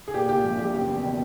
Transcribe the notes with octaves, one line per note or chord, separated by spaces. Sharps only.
G#4
A#2 G4
A#2 G4
A#1
A#1 G4
F#1 G4
E2
B2